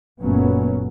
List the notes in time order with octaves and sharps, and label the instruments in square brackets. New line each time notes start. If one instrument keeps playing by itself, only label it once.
[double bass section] F#1 A#2 F#3 A3 B3 C#4